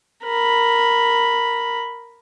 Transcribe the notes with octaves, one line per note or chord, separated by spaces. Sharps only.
A#4 B5